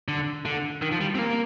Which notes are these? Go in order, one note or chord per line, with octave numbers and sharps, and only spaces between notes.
D3
D3
D#3
F3
G3
C4
A#3